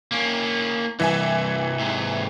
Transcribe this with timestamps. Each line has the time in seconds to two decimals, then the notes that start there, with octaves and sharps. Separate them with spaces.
0.12 A#3 C#4
1.00 C2 G2 E3 E5 G#5
1.79 G#2 C3